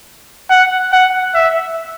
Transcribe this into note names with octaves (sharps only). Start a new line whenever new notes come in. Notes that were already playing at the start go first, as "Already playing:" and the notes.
F#5
F#5
E5